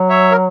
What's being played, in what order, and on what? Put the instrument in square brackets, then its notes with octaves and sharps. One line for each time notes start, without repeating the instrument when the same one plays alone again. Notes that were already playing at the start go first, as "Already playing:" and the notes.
Already playing: [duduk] F#3
[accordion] C#5 E5
A#4